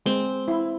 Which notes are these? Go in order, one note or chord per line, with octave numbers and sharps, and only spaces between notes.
G#3 C4
E4